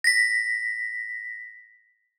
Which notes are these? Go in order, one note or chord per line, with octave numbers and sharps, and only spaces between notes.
A#6 B6